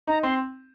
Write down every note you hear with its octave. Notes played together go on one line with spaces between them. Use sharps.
D#4 A#5
C4 C6